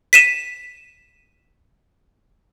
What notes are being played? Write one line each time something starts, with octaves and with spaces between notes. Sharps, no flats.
B6 D#7 E7